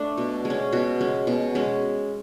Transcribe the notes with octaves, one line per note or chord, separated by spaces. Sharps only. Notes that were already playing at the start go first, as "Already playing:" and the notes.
Already playing: A3 D4
B2
G#3
C#4
B2 F#4
G#3 C#4
B2
G#3 C#4